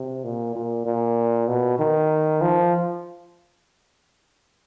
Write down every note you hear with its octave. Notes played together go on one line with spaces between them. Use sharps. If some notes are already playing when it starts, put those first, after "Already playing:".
Already playing: C3
A#2
A#2
A#2
B2
D#3
F3